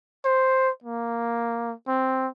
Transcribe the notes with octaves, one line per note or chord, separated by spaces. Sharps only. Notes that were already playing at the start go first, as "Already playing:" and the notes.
C5
A#3
C4